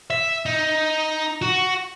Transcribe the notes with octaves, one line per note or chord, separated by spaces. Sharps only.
E5
D#4
F#4